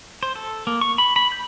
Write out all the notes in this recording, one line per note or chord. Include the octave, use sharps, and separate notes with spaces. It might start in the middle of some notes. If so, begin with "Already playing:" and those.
C5
A4
A#3
C#6
B5
B5
G6